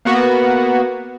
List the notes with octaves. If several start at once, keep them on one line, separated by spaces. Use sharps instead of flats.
A#3 B3 F#4